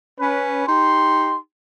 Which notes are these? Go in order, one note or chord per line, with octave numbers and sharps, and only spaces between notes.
C#4 B4
D#4 G4 C6